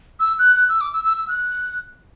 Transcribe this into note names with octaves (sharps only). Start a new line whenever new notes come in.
E6
F#6
F#6
E6
D6
E6
E6
E6
F#6